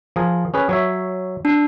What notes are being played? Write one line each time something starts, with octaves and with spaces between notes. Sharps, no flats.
F3 G#4 A#4
C#4 G#4 B4
F#3 C#5 E5
D4